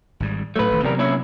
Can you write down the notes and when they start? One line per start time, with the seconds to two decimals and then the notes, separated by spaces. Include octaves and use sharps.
0.20 G#1 G#2 G3
0.56 A2 F#3 A3 B4
0.71 D#1 A1 D#3
0.84 E2 C3 F#3 G3 B3 A#4
0.98 A#2 C#4 E4